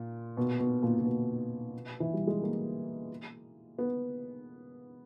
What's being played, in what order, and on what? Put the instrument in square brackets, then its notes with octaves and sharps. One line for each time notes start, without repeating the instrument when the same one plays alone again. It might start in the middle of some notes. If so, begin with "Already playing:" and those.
Already playing: [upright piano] A#2
B2
B2
A#2
A#2
B2
E3
G3
G#3
A#3
B3